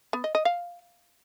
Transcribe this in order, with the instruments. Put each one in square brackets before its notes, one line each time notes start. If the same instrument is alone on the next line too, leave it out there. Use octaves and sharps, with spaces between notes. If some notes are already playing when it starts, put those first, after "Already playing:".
[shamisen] B3
D#5
D#5
F5